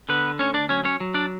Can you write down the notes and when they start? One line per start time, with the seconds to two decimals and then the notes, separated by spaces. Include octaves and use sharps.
0.09 D3 B3 B4
0.39 D2 C#4 C#5
0.54 D4 D5
0.69 F#3 C#4 C#5
0.85 C#4 C#5
1.00 F#3
1.14 D4 D5